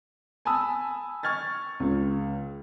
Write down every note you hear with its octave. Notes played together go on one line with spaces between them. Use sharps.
G#5 A5 B5 D#6 E6
C#6 F6 G#6 A6
C#2